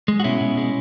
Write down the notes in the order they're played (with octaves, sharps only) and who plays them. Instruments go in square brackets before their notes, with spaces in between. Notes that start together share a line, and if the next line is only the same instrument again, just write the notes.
[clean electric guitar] G#3
F#4
B2 C#4 E4
B2
G#3